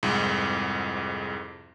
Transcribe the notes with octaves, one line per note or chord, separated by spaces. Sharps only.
C2 F2 G#2